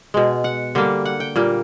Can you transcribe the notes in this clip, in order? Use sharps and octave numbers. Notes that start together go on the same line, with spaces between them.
B2 G#3
F#5
D3 G3 A#3
F#5
G5
A#2 G3 A#3